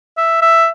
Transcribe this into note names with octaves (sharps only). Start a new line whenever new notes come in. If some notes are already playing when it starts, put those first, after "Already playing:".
E5
E5